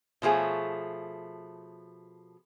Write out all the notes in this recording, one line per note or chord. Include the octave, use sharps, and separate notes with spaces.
B2 F3 A3 G#4 C#5